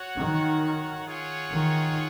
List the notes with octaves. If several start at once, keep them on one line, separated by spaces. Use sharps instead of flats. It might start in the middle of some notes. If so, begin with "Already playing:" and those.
Already playing: F#4 C#5 F#5
D#3
F4 G#4 C#5 F#5
D#3